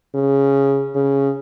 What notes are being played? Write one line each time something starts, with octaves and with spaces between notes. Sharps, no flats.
C#3
C#3